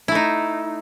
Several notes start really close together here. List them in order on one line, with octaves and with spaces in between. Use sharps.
E4 A3 D#4